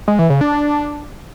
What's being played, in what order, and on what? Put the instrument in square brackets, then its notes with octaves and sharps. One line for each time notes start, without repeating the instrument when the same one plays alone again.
[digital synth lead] G#3
E3
C#3
D4
D4